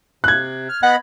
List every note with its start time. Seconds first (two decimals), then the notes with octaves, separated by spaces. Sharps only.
0.24 C3 F#6 G#6
0.69 F6
0.83 B3 D#5 F#5 B5